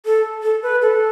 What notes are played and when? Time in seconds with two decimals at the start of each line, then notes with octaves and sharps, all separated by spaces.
0.05 A4
0.43 A4
0.63 B4
0.82 A4